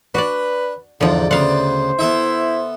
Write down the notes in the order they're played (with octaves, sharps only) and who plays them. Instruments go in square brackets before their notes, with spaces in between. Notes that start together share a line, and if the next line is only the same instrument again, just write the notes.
[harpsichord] D4 [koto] F#4 D5 [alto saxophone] B4
[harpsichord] E2 G#2 [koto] D3 F3 [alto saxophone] D5
[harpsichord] D2 C#3 B3 [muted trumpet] C5 [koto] F5 F#5
[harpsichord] B3 A4 E5 [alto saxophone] E4